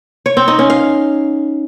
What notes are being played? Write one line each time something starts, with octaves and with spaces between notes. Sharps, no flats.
C#5
C4
D#4
C#4
F5